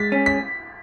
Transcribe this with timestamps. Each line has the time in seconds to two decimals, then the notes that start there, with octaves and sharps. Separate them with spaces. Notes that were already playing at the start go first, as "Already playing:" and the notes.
Already playing: G#3 A6 B6
0.12 C#4
0.26 B6